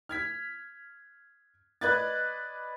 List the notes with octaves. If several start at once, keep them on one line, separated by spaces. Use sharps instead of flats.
F6 G#6 B6
B4 D5 D#5 F#6 G#6 A6